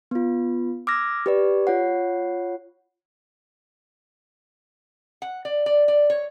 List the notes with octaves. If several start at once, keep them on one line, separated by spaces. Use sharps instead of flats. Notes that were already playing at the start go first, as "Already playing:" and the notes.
B3 F4
D6 E6 F6 G#6 A#6
G4 B4 D5
F4 C#5 F#5
F#5
D5
D5
D5
C#5